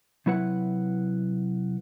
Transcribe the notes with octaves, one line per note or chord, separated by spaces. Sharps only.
C3 F#3 E4 B4 F#5